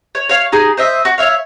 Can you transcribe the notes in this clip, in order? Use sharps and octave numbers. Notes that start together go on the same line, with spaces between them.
C#5
C#5 F5
D#4 G4 G#4 G#5
C5 D#5 E5
F#4
C#5 E5 F5